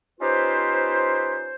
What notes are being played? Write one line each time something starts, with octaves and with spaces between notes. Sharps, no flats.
C#4 D#4 F4 G4 B4 C5